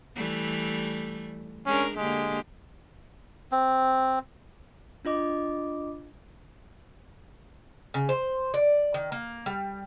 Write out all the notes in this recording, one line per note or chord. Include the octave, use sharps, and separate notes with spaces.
E3 G3 A3
G#3 C#4 D4 A#4
D3 G#3 A#3 G4
C4
D4 F4 D#5 D6
C#3
C5
D5
D#3
A#3
G3